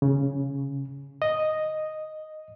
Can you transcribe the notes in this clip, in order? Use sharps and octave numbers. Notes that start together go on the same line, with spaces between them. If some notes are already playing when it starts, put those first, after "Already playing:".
C#3
D#5